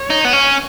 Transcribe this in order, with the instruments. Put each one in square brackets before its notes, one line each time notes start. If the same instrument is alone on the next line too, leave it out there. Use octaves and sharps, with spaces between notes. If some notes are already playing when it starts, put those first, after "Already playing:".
Already playing: [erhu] C#5
[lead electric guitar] D#4
B3
C#4